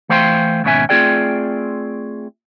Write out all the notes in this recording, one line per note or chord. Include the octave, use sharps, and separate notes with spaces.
E3 A3 C5 F5 G5 C6
D#2 G#2 B2 C#4 E5 G#5
A3 C4 F4 G#4 D5 G5